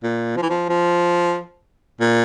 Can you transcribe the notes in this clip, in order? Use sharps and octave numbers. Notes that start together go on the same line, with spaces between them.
A#2
F3
E3
F3
F3
A#2